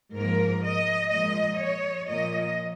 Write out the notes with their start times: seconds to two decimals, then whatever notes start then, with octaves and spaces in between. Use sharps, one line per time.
0.16 G#2 F3 A#3 A#4
0.65 D#5
1.12 A#2 F3 G#3 D#5
1.61 C#5
2.09 A#2 F3 A#3 D#5